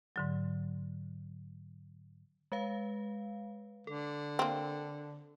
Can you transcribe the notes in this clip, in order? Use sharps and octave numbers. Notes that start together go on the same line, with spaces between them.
G#2 D3 F#3
G#3 B4 F5
D3 A4
A#3 C4